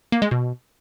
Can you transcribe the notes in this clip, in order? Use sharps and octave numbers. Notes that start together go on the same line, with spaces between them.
A#3
G#3
B2